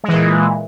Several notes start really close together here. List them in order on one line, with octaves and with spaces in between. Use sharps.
G#3 E3 A#2